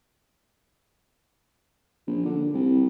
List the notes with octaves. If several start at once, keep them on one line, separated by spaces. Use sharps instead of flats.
A#1
D3
C2